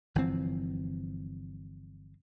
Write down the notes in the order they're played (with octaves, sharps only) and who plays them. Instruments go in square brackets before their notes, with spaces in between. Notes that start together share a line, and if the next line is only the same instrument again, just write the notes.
[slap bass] G1 E3 F3 C4